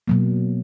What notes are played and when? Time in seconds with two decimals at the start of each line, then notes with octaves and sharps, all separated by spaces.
0.08 B2 F#3 A#3